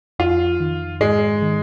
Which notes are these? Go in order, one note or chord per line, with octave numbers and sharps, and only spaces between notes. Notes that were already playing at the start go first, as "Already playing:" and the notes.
F2 F4
D#3
G#2 G#3
D#3